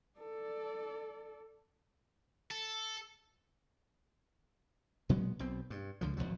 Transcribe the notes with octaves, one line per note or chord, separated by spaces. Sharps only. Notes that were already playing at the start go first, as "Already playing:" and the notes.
A4 D5
A4
A#2 F#3 G#3 B3
B1 B2 C4
G2
C#2 D3 F3
G#1 E2 F3 F#3